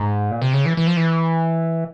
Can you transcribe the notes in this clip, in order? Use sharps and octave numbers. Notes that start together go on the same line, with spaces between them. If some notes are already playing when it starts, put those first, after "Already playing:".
Already playing: G#2
A#2
C3
C#3
E3
E3
F3
E3